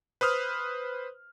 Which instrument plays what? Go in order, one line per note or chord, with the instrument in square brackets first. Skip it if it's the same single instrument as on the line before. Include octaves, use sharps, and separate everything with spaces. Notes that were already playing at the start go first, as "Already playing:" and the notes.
[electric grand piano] B4 C5 D#6 F6